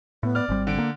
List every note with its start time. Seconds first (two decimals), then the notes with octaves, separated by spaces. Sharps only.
0.23 A2 B3
0.35 D5 F6
0.49 G#1 G3 C4
0.67 D3 D7
0.78 A#3